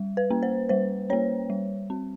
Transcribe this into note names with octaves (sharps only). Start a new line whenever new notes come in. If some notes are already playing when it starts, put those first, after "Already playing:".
Already playing: G3
B4
A#3 C#4
C5
G3 C5
A#3 C#4 C#5
G3
C4